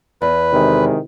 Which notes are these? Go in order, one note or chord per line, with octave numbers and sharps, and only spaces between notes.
E2 B4
C3 D#3 G#3